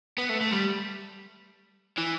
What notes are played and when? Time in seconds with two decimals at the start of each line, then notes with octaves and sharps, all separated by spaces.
0.18 B3
0.29 A3
0.41 A3
0.52 G3
1.98 E3